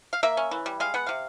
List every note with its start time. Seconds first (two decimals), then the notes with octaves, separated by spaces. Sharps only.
0.13 F5
0.23 A#3 E5
0.37 C#4
0.51 E3
0.66 G3
0.80 G#3 F5
0.94 B3 F#5
1.07 C3 F5